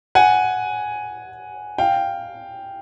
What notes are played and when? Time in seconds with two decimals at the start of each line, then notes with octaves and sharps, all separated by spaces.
0.15 F#5 G#5
1.78 F5 G5